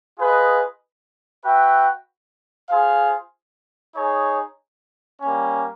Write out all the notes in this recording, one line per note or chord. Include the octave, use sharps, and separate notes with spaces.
F4 G#4 B4 D#5
F#4 B4 E5 G5
F4 G#4 C5 F5
D#4 G#4 C#5
G3 A#3 C#4